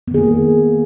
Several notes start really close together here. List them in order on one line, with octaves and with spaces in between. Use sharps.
B3 D#3 G#4 A#3